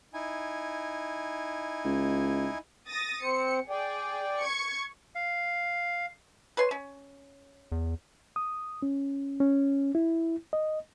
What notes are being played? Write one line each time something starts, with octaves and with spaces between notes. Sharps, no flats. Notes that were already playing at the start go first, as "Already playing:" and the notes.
D#4 E4 G#5
C#2
D#6 A6 A#6
C4 C5 C#7
G#4 D5 G5
C#6 G#6 C#7
F5
B4 C#5 C6
C#4
E2
D#6
C#4
C#4
E4
D#5